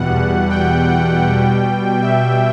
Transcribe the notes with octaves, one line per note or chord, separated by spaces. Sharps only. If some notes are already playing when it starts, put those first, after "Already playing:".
Already playing: E2 B2 G3 F#5
G5
B2 G3
E5